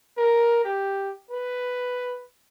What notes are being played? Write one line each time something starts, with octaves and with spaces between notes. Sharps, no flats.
A#4
G4
B4